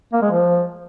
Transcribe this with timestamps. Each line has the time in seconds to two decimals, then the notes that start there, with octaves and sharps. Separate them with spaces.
0.13 A#3
0.22 G#3
0.31 F3